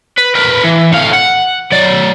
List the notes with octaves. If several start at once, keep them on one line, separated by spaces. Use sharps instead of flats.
B4
A#4 B4
E3
A2 F5
F#5
F#3 D5